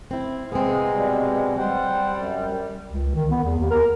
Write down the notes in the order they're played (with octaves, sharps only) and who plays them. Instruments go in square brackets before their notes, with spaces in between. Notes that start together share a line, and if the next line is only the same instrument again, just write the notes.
[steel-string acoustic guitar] C4 E4
[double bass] C3 G#3 [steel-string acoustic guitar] B3 C4 [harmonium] G#4
[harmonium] B2 G3
[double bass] G3 [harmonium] C5 F#5 G5
[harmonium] F#2
[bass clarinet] C#2
D#3
B3
E2
D#2
A#4